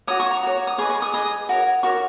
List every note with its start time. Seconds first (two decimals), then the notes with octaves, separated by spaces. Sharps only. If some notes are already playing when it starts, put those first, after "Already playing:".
0.07 F#4 C#5 D#6
0.20 C#6
0.31 A#5
0.43 F#4 C#5
0.67 D#6
0.78 G#4 B4 D#5 C#6
0.90 C#6
1.02 D#6
1.13 G#4 B4 D#5 D#6
1.49 F#4 A#4 C#5
1.83 F#4 A#4 C#5 C#6